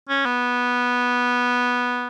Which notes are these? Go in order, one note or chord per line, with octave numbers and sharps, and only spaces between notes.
C#4
B3